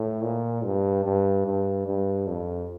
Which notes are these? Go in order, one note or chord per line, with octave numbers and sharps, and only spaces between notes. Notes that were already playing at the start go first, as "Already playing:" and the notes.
Already playing: A2
A#2
G2
G2
G2
G2
F2